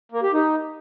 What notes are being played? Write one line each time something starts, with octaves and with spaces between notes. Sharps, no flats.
A#3
G4
D#4